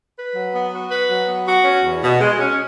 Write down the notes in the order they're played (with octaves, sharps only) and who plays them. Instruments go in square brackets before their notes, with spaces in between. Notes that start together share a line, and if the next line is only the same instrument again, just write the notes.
[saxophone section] B4
F#3
B3
F#4
B4
F#3
B3
F#4
C#4
E2
B2
G#3
C#4